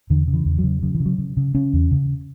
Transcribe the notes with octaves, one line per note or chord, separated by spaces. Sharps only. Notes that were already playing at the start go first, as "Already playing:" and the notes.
E2 D3
C#3
E3
E2
F#3
C#3
C#3 F#3
E3
C#3
F#3
C#3
C#3
C#3 C#4
E2
C#3